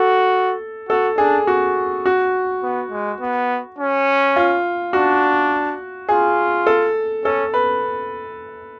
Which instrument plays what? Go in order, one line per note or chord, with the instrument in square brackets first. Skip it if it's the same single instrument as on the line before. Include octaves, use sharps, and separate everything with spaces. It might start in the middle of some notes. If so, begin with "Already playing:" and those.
Already playing: [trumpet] F#4 [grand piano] A4
[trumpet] F#4 [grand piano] A4
[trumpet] D4 [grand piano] G#4
[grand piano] F#4
F#4
[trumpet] B3
G#3
B3
C#4
[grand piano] F4
[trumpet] D4 [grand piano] F#4
[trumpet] F4 [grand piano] G#4
[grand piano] A4
[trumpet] C#4 [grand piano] A4
[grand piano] B4